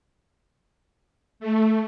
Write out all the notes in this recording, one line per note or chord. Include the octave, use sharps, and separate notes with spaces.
A3